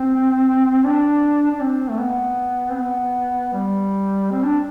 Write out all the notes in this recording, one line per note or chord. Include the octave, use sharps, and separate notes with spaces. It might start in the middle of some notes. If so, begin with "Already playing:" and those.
Already playing: C4
D4
D4
C4
A3
B3
C4
B3
G3
C4
D4